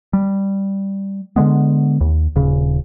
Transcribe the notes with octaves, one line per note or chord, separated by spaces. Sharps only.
G3
D3 E3 G#3 B3
D#2
D#1 C#3